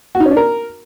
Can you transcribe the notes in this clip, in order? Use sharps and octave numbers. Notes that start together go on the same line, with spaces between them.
F#4
D#4
C#4
D4
A#4